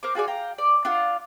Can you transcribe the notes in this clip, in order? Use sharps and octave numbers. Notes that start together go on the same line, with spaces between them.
A#4 C5 D6
F4 F#4 G#4 D5
F5 G5 A#5
D5
D4 F4 F5 F#5